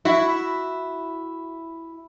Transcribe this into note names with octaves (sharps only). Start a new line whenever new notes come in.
E4 F#4